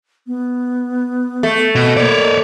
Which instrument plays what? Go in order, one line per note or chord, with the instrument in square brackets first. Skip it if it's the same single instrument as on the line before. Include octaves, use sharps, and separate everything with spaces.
[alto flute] B3
[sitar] A3
[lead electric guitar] B2
[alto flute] A#3 [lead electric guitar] C#5 D5